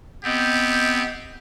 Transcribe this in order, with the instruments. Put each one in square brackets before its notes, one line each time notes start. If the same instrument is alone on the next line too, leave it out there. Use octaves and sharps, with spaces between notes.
[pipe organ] B3 C4 [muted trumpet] G4 [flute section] D#5 G6